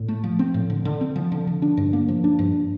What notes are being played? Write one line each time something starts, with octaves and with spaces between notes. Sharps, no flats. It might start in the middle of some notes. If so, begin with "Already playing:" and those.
Already playing: A2
A3
F3
C4
A2
D3
D3
C4
F3
D3
D3
D4
G2
A#3
F3
D4
G2